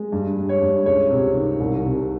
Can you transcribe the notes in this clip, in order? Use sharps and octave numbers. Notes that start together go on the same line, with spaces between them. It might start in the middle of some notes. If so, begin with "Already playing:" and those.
Already playing: G#3
G2
G3
C#5
G2
C#2 C#5
C3
D#3
C2
C3